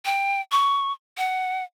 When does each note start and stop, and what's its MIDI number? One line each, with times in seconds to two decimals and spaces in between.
0.05 0.41 79
0.52 0.92 85
1.18 1.64 78